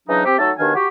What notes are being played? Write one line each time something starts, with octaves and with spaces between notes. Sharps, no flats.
C#3 E3 F#3 D4 D#4
C4 G4
F#3 A3 D#4 F#4 A4
D#2 B2 D#3 D4 F5 G#5
F#4 G4